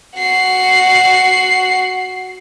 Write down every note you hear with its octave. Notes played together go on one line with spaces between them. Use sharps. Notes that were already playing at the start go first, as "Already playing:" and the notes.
F#4 C7